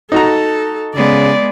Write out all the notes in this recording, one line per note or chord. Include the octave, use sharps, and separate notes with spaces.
D#4 F#4 A4 A#5
C#3 G#3 B3 D5